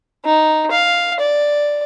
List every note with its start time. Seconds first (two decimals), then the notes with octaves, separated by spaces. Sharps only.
0.25 D#4
0.71 F5
1.20 D5